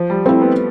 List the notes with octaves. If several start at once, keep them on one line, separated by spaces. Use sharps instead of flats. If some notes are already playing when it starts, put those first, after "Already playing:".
Already playing: F3
G3
A3 C4 E4
B3